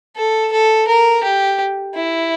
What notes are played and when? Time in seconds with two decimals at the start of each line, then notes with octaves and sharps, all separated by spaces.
0.16 A4
0.52 A4
0.88 A#4
1.23 G4
1.95 E4